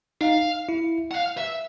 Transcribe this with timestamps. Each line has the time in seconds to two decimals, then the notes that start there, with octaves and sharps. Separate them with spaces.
0.21 D#4 F5
0.69 E4
1.11 F#5
1.15 F5
1.38 E5